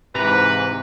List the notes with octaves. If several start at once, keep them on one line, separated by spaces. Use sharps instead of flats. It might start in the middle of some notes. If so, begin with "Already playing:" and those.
G#2 C3 E3 B4 A#5